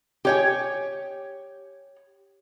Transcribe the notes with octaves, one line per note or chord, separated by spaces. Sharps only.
G4 C#5 G#5